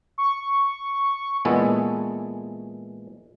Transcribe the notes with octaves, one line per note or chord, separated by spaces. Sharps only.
C#6
A#2 E3 G#3 B3 A4